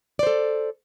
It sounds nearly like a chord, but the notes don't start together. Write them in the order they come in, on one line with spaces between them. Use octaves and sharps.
D5 C5 A4